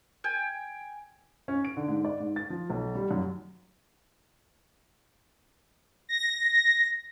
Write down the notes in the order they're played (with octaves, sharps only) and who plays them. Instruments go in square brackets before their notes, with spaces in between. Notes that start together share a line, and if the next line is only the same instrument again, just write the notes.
[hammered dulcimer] G5 G#5
[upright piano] C#4
D7
D3
G#2
D5
G#2
A6
F3
B1
G3
F#2
[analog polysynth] A#6